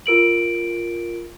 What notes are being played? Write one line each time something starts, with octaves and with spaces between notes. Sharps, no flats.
F4 A#4 D7 F#7